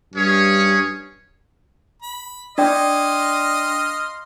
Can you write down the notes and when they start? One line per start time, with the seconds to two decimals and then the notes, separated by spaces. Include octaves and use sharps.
0.14 G2 C#4 G#4 C#5
2.02 B5
2.58 D4 D5 D#5 F5 G5 C6